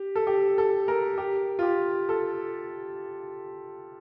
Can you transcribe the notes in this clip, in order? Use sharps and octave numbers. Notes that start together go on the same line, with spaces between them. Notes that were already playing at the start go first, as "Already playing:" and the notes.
Already playing: G4
A4
G4
A4
A#4
G4
F4
G4
A4